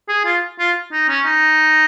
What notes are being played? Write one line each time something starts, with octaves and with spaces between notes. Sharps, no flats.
G#4
F4
F4
D#4
C#4
D#4